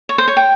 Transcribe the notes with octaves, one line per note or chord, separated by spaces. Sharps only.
C#5
C5
C#5
G5